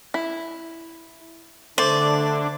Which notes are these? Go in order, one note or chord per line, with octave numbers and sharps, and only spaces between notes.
E4
D3 A3 D4 C5 D5